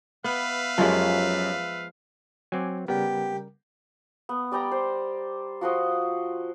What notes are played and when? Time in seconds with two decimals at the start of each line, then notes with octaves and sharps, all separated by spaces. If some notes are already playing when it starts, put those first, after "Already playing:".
0.24 B3 B4 E5 F5
0.78 F#2 F3 G#3 C#4 G4
2.52 F#3 C4 G#5 D6
2.88 C#3 G3 B3 G4 A#4
4.29 B3
4.52 G3 D5 G5 A#5
4.71 C5
5.61 F3 F#4 C5 D#5